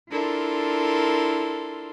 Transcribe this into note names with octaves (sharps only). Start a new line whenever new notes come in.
D4 E4 F4 A4 A#4 C6